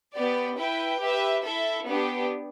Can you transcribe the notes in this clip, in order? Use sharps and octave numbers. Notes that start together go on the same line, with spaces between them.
B3 G4 D5
E4 B4 G5
G4 B4 E5
E4 A4 E5
B3 D4 G4